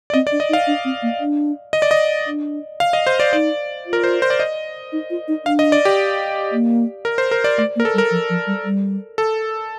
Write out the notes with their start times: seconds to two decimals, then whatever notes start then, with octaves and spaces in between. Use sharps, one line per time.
0.10 D5
0.14 C4 D#5
0.27 D5
0.32 D4
0.40 D#5
0.49 D#4
0.53 F5
0.67 D4
0.85 C4
1.02 A#3
1.20 D4
1.73 D#5
1.82 D5
1.91 D#5
2.27 D4
2.80 F5
2.93 D#5
3.07 C5
3.20 D5
3.33 D#4 D5
3.86 F4
3.93 A#4
4.04 C5
4.22 C5
4.30 D5
4.40 D#5
4.92 D#4
5.10 F4
5.28 D#4
5.45 D4 F5
5.59 D#5
5.72 D5
5.85 G4
6.52 A#3
7.05 A#4
7.18 C5
7.31 A#4
7.44 D5
7.58 A3 D5
7.76 A#3
7.80 A#4
7.85 A4
7.94 G3
7.98 A#4
8.11 F3
8.30 F3
8.47 G3
8.64 G3
9.18 A4